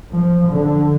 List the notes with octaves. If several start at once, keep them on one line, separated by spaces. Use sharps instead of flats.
F3
D3